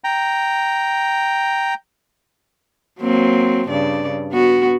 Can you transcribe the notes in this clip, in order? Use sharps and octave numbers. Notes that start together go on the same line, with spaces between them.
G5 A#5
F#3 A#3 C4
G2 C#3 D5
B3 F#4